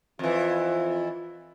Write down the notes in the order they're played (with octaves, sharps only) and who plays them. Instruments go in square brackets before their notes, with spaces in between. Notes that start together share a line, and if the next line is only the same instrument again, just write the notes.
[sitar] F2 E3 [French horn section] F4